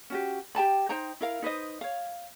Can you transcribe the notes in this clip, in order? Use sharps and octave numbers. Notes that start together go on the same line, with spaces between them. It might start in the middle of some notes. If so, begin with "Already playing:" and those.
C#4 F#4 G4
G4 G5 A5 B5
D#4 C5 G5 A#5
E4 A#4 F5
D#4 B4 C5 D#5
C#5 F5